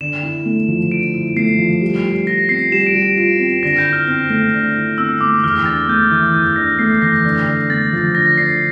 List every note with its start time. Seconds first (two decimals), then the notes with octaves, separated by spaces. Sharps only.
0.01 D3 E7
0.23 E4
0.46 A3
0.68 F3
0.91 D3 D7
1.14 E4
1.36 A3 C7
1.58 F3
1.81 G3
2.04 G3
2.26 F4 A#6
2.49 C4 C7
2.72 G3 E7
2.87 D7
2.95 G3
3.02 D7
3.17 F4 D7
3.39 C4
3.63 D3 A#6
3.78 G6
3.85 E4
3.93 F6
4.08 C4
4.30 A3
4.53 D3
4.76 E4
4.98 C4 E6
5.21 A3 D6
5.44 E2 F6
5.66 D4 A6
5.88 A3 G6
6.11 E3 G6
6.34 E2 G6
6.56 D4 A#6
6.79 A3 C7
7.02 E3 A#6
7.24 D3
7.47 D3
7.70 A3 A6
7.93 F3
8.15 D3 A#6
8.38 D3 C7